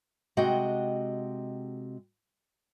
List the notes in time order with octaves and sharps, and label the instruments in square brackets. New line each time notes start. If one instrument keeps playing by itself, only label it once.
[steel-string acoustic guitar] C3 G#3 F#4 D#5 G5